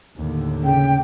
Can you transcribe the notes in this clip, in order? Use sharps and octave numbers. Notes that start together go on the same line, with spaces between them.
D#2 A2 D3
C#3 G5